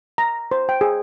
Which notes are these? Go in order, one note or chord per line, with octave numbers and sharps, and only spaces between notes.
A#5
C5
G5
G#4